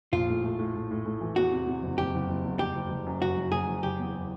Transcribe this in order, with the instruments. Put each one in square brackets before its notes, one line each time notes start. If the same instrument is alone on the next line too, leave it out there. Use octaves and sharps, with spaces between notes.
[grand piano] A#1 [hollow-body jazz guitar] F4
[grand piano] A2
A3
A2
A2
A2
A2
E3
[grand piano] E2 [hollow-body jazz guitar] F#4
[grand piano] C3
C3
F#1
[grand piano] F#1 [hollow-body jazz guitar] G4
[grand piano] F#1
F#1
E2
[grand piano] F#1 [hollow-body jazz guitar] G4
[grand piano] F#1
F#1
F#2
[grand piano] F#1 [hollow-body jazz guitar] F#4
[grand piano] F#1
[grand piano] F#1 [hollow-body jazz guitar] G#4
[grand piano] F#1
[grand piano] F#1 [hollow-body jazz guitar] G4
[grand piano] E2